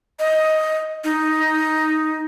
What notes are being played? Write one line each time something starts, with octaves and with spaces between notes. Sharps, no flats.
D#5
D#4